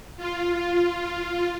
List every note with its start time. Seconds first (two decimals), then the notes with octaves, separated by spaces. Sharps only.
0.17 F4